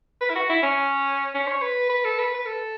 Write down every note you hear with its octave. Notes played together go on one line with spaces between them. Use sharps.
B4
E4
F#4
E4
C#4
C#4
C#5
B4
B4
A4
B4
B4
A4